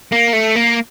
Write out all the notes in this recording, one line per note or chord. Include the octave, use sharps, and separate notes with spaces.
A#3
A3
A#3